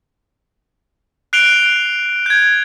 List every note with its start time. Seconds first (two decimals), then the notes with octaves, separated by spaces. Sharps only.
1.33 F#6 C7 D7 F7 G7
2.26 G6 G#6